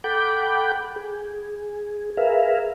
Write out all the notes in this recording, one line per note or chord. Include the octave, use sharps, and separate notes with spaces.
A4 F#5 G5 B5 D6 G6
G#4
G#4 A#4 B4 E5 F5